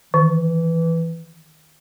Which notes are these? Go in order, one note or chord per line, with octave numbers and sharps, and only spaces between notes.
D#3 E3